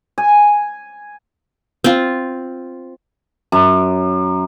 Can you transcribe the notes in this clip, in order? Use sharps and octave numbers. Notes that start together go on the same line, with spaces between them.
G#5
C4 F4
F#2